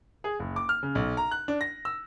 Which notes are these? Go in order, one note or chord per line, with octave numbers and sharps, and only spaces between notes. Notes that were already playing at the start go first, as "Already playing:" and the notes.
G#4
F#1
D6
F6
C#3
B1
A#5
F#6
D4
A#6
E6